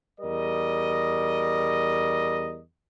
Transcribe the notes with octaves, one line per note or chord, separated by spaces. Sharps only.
E2 G3 A#4 D#5